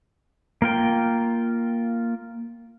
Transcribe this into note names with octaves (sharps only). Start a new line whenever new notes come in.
A#3 F4 G5